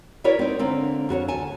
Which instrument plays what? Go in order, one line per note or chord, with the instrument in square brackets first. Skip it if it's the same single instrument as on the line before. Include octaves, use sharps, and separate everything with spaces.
[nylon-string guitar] E4 F#4 A#4 B4 C#5 D5
C4 D#4
D3 A#3 C4
F2 F#4 A#4 C#5
D2 G#5 A5